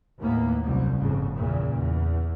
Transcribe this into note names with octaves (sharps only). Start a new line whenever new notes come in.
D#2 A2 A#3 B3
C2 F#2 G3
G1 F2 A2 C#3
E2 A#2 C#3
E2